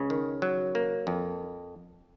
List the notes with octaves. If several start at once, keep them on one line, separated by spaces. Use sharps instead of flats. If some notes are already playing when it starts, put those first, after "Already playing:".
Already playing: C#2 C#3 C#4
D#3
F#3
A#3
F2